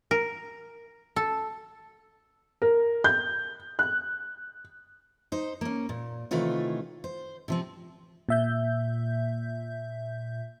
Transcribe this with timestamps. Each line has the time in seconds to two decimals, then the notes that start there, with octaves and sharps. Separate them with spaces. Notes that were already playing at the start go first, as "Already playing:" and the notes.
0.11 A#4
1.16 A4
2.62 A#4
3.04 G6
3.79 F#6
5.32 D#4 C5
5.61 A#3 C#4
5.89 A#2
6.31 C3 D#3 E3 A3 F4 C#5
7.04 C5
7.48 C3 F3 C4
8.29 A#2 E5 G6